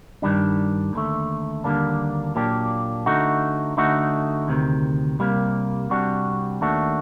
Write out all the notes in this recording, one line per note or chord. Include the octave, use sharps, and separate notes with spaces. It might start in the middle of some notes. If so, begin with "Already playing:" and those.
G2 D#3 G3 D4
D#2 D3 A3
D#2 D3 G3 A#3 D4
A#2 F#3 A#3 D4 G4
D3 A3 D#4 F#4
D3 A3 D#4 F#4
D2 C3 D#3
C2 C3 G3 A#3
C2 C3 G3 D4 F#4
D#2 D#3 A3 D4 F#4